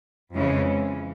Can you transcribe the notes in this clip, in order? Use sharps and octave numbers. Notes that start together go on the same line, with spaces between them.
F2 C#3 E3 G#3 C#4